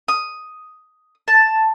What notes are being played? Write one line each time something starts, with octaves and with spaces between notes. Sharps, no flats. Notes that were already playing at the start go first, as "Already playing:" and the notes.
D#6
A5